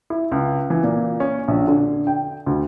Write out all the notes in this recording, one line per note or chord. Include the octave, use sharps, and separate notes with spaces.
E4
C#2
E3
A#2
C#4
A#1
D3
G5
D2